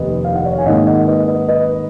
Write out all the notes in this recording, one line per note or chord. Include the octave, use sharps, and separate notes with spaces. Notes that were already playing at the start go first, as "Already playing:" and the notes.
Already playing: F1 D#2 B4 D#5
F5
F#5
C#5 F5
G#5
G#1 G#2 D#3 A#3 D#5 F#5
D#5 F#5
B4 D#5
B4 D#5
B4 D#5